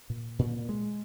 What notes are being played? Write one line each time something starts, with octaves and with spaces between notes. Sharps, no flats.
A#2
A#2
G#3